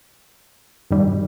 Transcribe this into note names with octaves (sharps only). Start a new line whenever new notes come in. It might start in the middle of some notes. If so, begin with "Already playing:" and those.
G2 D#3 G3